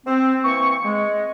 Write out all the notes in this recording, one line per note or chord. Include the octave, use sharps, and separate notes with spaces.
C4
E3 A#3 C4 C#6
G#3